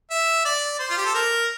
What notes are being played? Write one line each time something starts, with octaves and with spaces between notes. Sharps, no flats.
E5
D5
C5
F4
G4
A4
A#4